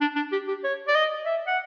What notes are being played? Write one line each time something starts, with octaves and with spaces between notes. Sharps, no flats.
D4
D4
G4
G4
C#5
D5
D#5
E5
F#5